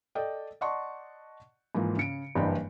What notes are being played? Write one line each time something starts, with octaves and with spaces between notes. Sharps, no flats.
A4 D5 D#5 G5
D5 D#5 F#5 A5 C6 C#6
G#2 E3 F3 A#3
C#3 C#7 D7
F#1 G2 E3 D4 D#5 G5